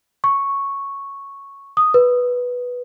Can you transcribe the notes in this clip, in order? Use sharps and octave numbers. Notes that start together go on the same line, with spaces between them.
C#6
D#6
B4